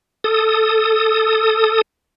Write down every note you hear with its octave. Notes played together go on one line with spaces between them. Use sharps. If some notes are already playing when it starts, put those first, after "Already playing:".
A4 D#6